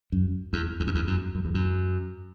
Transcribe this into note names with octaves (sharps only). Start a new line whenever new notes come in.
F#2
E2
E2
F#2
E2
F#2
F#2
E2
F#2